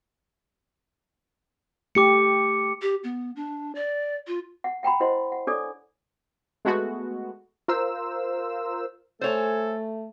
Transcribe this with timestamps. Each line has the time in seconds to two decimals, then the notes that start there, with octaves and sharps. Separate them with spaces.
1.95 A3 G4 D6 C#7
2.82 G4
3.04 B3
3.36 D4
3.75 D5
4.27 F4
4.64 F#5
4.83 F#5 G5 A#5 B5
5.00 E4 C5 D#5 F#5 C6
5.32 F#5
5.47 D4 A4 C#5 D5 G#5 D6
6.65 G#3 A3 B3 F#4
7.68 F4 A#4 C5 E6
9.21 A3 A4 C5 C#5 G#5